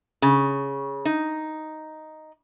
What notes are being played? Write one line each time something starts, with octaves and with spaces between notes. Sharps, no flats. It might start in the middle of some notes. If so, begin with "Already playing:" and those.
C#3
D#4